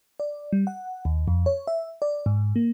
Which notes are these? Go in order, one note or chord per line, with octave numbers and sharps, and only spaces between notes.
D5
G3
F#5
D#2
F2
C#5
E5
D5
G#2
A#3